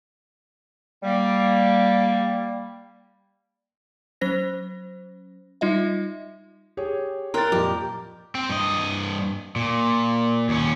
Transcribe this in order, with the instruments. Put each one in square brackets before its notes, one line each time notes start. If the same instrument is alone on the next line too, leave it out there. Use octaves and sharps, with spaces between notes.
[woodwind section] G3 A#3
[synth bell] F#3 C#4 C5 A#6
G3 D#4 F4 D#5 E5
[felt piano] G4 G#4 C#5
[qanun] A#4 G5 [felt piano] C6 F#6 A6
[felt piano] F2 A#2 [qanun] G4
[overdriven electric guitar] C4
G2 D#5
A#2
D#2 C#4